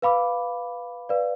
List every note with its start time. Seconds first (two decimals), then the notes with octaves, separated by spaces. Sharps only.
0.02 B4 F5 B5 D6
1.09 B4 D5 F5